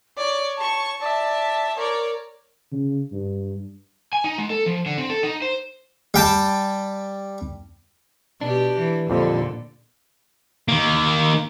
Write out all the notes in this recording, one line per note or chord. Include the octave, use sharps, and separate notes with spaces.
C#5 D5
A5 C#6
D5 E5 A5
A#4 C#5 D5
C#3
G2
G#5
D#4
G#3
A4
F3
D3
C4
A4
D#4
C5
G3 G5 A5
B2 D4 G4
E3
F2 A#2 D3 G3 C4
D#3 A#3